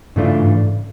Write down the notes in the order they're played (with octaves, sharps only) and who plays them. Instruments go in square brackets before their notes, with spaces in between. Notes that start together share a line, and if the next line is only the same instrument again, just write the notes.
[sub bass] G2 [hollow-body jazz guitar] C#3 E3 A3 D4 F4
[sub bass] G#2